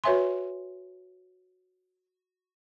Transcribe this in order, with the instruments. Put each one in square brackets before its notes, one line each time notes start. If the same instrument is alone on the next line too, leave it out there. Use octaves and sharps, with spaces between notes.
[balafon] F#4 B4 C#5 E5 G#5 C6